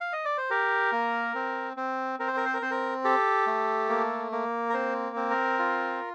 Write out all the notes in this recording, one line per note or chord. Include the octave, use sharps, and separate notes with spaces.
F5
D#5
D5
C5
G4 A#4
A#3
C4
C4
C4 A#4
C5
A#4
C5
A#4
C4 C5
A#4
G4 A4
A3
A#3
A#3
A#4
C4 C5
C4
A#4
F4